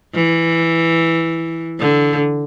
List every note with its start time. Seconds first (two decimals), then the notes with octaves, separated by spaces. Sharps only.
0.14 E3
1.79 D3